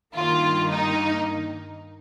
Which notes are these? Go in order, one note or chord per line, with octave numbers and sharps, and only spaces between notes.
G2 D#3 A#3 F4
D#4